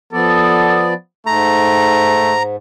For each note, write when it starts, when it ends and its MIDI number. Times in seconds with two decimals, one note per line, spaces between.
0.13 0.94 53
0.13 0.94 59
0.13 0.84 69
0.13 0.94 74
1.26 2.56 44
1.26 2.36 57
1.26 2.43 82